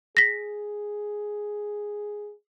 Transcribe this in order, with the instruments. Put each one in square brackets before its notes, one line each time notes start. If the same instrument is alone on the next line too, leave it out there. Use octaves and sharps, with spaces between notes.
[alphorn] G#4 [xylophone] A#6 B6